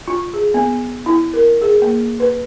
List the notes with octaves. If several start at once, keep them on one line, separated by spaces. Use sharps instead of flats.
F4
G#4
B3
E4
A#4
G#4
A#3
B4